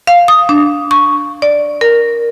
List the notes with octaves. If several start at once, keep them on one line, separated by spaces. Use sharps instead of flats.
F5
D#6
D4
C#6
D5
A#4